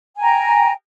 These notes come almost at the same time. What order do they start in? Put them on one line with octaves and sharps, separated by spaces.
G#5 G5 A#5